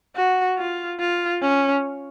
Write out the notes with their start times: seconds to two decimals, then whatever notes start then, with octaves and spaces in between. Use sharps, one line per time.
0.16 F#4
0.58 F4
1.00 F4
1.42 C#4